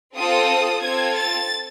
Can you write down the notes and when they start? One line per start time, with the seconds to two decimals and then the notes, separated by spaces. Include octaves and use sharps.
0.15 C4 F4 A4 D#6
0.81 C4 F4 A4 G#6
1.15 A6